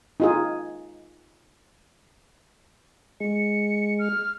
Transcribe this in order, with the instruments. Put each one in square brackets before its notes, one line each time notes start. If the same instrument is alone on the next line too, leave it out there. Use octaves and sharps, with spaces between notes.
[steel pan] D#4 F4 G#4
[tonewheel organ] G#3 [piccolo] C#7
[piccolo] F6